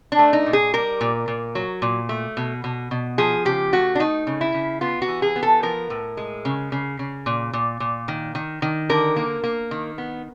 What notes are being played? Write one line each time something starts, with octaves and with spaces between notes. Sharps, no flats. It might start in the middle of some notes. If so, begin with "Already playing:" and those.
D4
A3
D#4
A#2
G#4
G3 A#4
A#2
A#2
F#3
A#2
A3
B2
B2
B2
F3 G#4
C#3 G4
A3 F#4
D4
A3 D#4
C#3
E4
C#3
B3 F4
F#4
E3
G#4
B3
A4
F3 A#4
A2
G#3
C#3
C#3
C#3
A#2
A#2
A#2
D#3
D#3
D#3
D3 A#4
A#3
A#3
D#3
B3